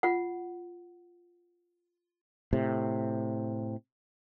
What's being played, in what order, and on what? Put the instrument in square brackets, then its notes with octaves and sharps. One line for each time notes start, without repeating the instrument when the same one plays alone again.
[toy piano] F4 F#5
[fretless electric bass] A2 C3